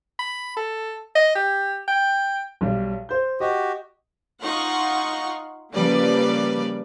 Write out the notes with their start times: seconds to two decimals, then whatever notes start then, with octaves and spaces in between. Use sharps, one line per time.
0.19 B5
0.57 A4
1.15 D#5
1.35 G4
1.88 G5
2.61 B1 G3
3.09 C5 G6
3.40 F#4 G4 D#5
4.42 D#4 F4 F#5 C6 C#6
5.74 C#3 F3 G3 A#3 B4 D5